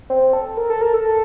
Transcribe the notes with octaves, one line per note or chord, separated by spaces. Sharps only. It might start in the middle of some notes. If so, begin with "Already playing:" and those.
C4
A4
A#4
A4
A#4
A4